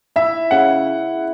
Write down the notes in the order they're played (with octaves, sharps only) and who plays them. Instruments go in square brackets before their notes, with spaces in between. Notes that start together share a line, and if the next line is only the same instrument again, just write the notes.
[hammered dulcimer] E4 [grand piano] E5
[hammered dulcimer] C#3 [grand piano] F#5